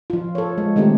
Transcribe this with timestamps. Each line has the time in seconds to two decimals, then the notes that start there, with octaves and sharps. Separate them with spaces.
0.10 F3 F4
0.35 A4 C#5
0.58 G#3
0.76 D#3 G#3 A3 C4 G4